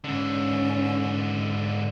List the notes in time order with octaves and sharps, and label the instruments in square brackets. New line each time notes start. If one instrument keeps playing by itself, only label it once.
[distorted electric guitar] G#2 D3 [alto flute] C#4